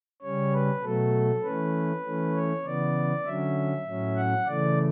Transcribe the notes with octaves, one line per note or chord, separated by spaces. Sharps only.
C#3 G3 C#4 C#5
B4
B2 F#3 A3 A4
E3 A3 C#4 B4
E3 A3 C#4
C#5
C#3 E3 B3 D5
D3 F#3 C#4 E5
A2 F#3 C#4
F#5
C#3 E3 A3 D5